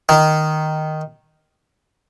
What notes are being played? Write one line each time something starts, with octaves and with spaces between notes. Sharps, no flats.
D#3